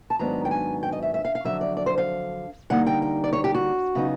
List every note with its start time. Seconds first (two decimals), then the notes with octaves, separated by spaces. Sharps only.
0.10 A5
0.19 G#2 D#3 F#3 B3 D4 A#5
0.45 G5
0.51 G#5
0.83 G5
0.92 D#5
1.03 E5
1.14 E5
1.25 F5
1.35 F5
1.45 F2 D3 F#3 E5
1.61 D5
1.77 D5
1.86 C5
1.98 F5
2.70 D3 G3 A#3 D#4 F#5
2.86 G5
3.02 G5
3.24 D5
3.33 C#5
3.44 G4
3.54 F#4
3.95 C#3 F#3 B3 D#4